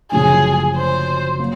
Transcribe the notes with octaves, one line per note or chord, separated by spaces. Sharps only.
F#1 F#2 D3 F3 A3 G#4
C5
F#3 A#3